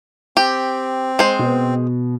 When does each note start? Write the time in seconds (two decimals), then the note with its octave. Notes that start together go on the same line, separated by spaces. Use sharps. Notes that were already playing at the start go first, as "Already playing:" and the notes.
0.37 C4 G4
1.19 G#3 C5
1.39 B2